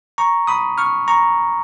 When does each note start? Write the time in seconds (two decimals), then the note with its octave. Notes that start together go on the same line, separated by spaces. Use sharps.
0.18 A#5 C#6
0.47 B5 D#6
0.78 C#6 F6
1.08 A#5 C#6